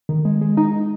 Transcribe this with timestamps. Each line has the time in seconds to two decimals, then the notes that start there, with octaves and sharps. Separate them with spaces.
0.09 D#3
0.25 G#3
0.41 G#3
0.57 D#4